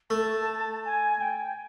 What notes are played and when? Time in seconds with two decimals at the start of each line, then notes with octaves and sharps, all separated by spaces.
0.10 A3 A5
0.85 G#5
1.21 G5